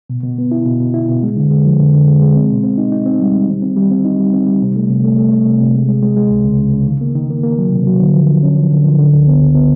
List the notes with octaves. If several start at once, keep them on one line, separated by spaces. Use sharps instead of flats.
B2
B2
B3
E4
B2
B2
E4
B2
G#3
D3
G#3
F3
D3
D3
G#3
G#3
C4
B2
C4
D#4
D#4
C4
G3
G3
D#3
C4
G3
C4
D#4
G3
C4
G3
C3
A3
C3
A3
A3
A3
C3
C3
G#3
G#3
G#3
G#3
C#2
C#3
C#3
C#3
D#3
A#3
D#3
A#3
A#3
F#3
C3
F#3
D3
F3
F3
C#4
F3
D3
F3
D3
C#2
B3
C#2
B3